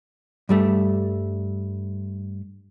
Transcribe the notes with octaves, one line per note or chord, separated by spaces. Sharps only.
G2 G3 A3